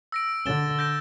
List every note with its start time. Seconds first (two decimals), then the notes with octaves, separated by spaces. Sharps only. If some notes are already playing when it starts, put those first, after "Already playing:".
0.12 E6 A#6 D7
0.45 D3 A6 E7 G7
0.79 G6 A#6 D7